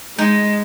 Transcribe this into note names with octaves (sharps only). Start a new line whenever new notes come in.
G#3 D#4